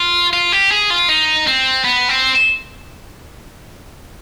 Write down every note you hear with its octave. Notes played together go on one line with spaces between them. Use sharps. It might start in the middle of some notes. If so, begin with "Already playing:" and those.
Already playing: F4
F4
G4
G#4
F4
D#4
C4
B3
C4